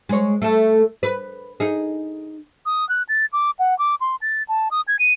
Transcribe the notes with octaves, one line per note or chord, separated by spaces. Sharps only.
G#3 C#5
A3 A4
B4
D#4 G#4
D#6
F#6
A6
D6
F#5
D6
C6
A6
A5
D#6
G#6
D#7